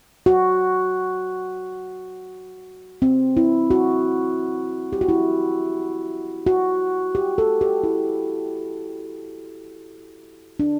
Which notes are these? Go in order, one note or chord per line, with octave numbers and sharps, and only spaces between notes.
F#4
C4
E4
F#4
G4
F#4
E4
F#4
G4
A4
G4
E4
D4